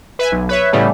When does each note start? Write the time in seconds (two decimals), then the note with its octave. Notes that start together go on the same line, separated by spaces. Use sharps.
0.19 B4 E5 G#5
0.32 B1
0.49 B4 C#5 E5
0.73 A2 C#3 E3 G3 A3 B3